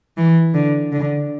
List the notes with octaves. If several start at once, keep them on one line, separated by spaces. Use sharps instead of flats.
E3
D3
D3